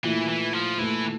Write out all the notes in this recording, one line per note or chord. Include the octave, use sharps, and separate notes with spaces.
A#2 E3 A3 E4
E3
F3
A#2 E3 A3 E4